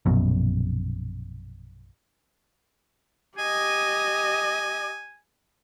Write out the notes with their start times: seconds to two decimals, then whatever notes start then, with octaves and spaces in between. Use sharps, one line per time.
0.06 A#1 F#2 B2
3.38 G4 D#5 G#5